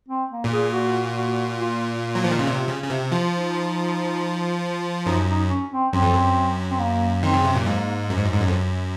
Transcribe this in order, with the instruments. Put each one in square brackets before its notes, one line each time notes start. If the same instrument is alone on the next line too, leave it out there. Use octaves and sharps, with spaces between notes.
[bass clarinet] C4
A#3
[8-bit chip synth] A#2
[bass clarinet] G#4
F#4
F#4
F4
F4
[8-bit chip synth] F#3
F3
D#3
C#3
C3
C#3
C#3
C3
F3
[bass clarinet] D#4
[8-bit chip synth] F#2 [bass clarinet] D#4
[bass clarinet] D#4
C#4
C4
[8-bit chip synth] F#2 [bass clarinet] C4
[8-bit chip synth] F2
F#2
[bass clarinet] C4
A#3
[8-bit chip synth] D#3 [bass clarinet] C4
[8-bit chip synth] C#3
C3
A#2
[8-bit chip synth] G#2 [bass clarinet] A#3
[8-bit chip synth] F#2
G#2
F#2
G#2
F#2
F2
F#2